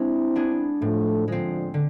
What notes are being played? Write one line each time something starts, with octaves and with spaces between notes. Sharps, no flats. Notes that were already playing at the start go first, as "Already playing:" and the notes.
Already playing: G#3 C4 D4 E4
B3 D4 G#4
A2 F3 A3
D3 F3 G#3 C4
D3